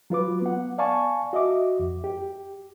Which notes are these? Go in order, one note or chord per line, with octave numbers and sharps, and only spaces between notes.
F#3 F4 B4 D6
B3 F#5
D5 F5 G#5 A5 C#6
F#4 D#5 E5 D6
F2
G4